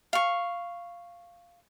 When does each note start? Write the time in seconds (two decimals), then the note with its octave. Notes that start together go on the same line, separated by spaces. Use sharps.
0.13 F5 C#6